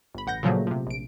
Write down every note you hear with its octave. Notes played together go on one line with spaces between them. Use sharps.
G1 B5
A1 F#5 G6 A#6
A#2 C#3 F3 F#3 A3 A#3
C3 F3
A#1 D7